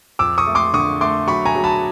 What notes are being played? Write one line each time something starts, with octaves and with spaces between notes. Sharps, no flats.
F2 D6 E6
C#6 D#6
A3
C6 D6
D3 C#6 D#6
A3 C6 D6
F#3 B5 C#6
G#5 A#5
F#3
A5 B5